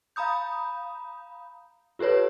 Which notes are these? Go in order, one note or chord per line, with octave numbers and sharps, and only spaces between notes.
F5 A#5 B5 D#6 G6
F4 G4 A4 B4 C#5